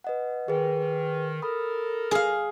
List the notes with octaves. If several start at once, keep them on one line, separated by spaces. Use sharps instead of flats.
B4 D#5 F#5
D#3 G#4 B4
A4 A#4 B5 D#6
G#4 F5